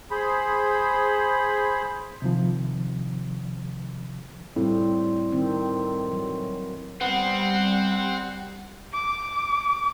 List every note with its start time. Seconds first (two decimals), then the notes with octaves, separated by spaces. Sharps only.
0.11 G#4 C5 B5
2.22 C3 D#3 F3
4.56 A2 G3 C4
5.32 D#3 C4
6.11 E3 F#3
7.01 G3 B3 C4 F#5
8.93 D6